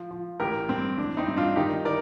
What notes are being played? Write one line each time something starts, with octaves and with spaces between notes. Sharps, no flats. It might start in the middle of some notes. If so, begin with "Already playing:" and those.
Already playing: F3
F3
A1 G4 A#4
G2 C4
A1 D4
C4 D#4
G2
D4 F4
D#3 D#4 G4
D#3 A#4 D5